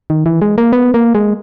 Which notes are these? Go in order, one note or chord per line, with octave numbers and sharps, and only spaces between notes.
D#3
E3
G#3
A#3
B3
A#3
G#3